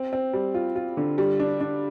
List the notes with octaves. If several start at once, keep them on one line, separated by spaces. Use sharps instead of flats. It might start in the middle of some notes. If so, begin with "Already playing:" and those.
Already playing: C4
C4
G3
F4
F4
D3
G3
D4
D4